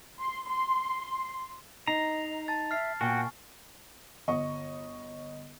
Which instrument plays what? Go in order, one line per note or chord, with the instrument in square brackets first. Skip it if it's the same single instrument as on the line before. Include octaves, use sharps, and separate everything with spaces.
[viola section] C6
C6
[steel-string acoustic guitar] D#4 [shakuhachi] D#5 [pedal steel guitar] A#5 [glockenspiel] A#6 C7
[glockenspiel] A5 A6
[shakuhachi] E5 [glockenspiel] F6 C7
[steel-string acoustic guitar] A#2 [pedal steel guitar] F#4 [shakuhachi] G5 [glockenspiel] G#5 C#6
[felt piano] G1 D#5 C#6